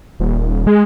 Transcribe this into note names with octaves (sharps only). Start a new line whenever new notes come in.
D#1
G#3